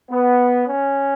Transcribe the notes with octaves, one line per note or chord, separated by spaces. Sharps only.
B3
C#4